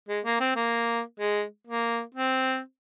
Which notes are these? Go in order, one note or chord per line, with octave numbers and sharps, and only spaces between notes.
G#3
A#3
C4
A#3
G#3
A#3
C4